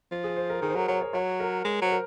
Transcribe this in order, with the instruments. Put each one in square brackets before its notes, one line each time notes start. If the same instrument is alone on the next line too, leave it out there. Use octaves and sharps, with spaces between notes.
[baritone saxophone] F3
[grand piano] G#4
C5
A#4
[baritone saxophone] D#3 [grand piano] G#4
[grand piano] C5
[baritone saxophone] F#3 [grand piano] A#4
[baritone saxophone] F#3 [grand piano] C#5
[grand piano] C#5
[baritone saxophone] F#3 [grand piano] C#5
[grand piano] A#4
[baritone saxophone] G#3 [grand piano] A#4
[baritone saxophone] F#3 [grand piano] C5
[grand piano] A#4